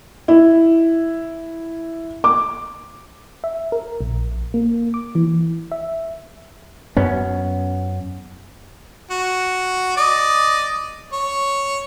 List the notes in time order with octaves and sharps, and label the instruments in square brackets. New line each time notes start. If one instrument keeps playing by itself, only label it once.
[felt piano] E4
D6
[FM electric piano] E5
A#4
A#1
A#3
D6
E3
E5
[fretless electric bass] F#2 B3 C#4
[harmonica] F#4
D5 D#5
C#5